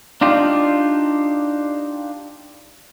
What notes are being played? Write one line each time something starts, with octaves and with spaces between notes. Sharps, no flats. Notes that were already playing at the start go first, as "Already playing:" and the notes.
D4 D#4 F4 G4